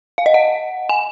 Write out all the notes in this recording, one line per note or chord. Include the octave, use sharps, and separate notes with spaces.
F5
D#5
F#5
G#5